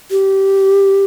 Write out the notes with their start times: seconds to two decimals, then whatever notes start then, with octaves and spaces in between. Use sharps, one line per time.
0.11 G4